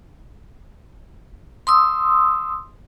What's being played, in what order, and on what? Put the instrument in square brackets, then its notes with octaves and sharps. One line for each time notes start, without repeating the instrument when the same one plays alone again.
[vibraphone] C6 D#6 E6